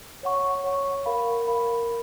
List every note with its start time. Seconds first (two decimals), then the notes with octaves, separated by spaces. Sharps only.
0.23 C#5 F#5 C#6
0.64 C#5 F#5 C#6
1.06 A#4 F5 B5
1.47 A#4 F5 B5